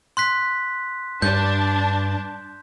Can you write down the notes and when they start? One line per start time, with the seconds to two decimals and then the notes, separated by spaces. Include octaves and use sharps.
0.17 C6 F#6 B6
1.22 G2 D4 A5 G6